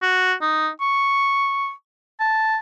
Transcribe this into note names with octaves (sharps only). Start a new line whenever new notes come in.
F#4
D#4
C#6
A5